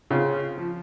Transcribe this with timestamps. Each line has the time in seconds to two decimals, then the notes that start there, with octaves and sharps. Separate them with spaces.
0.11 C#3 C4 F4 G#4
0.58 F3